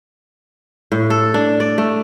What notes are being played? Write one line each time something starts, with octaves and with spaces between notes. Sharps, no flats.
A2
A4
D4
D5
A3